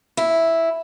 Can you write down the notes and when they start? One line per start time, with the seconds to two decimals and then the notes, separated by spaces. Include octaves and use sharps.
0.17 E4